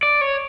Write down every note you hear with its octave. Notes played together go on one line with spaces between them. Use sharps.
D5
C#5